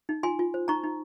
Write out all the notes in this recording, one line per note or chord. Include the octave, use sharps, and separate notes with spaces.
D#4
F4 G#5 C6
F4
C5
D#4 A#5 C#6
D#4